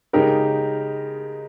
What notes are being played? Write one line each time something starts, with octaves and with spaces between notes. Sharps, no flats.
C#3 G#3 D#4 G4 A#4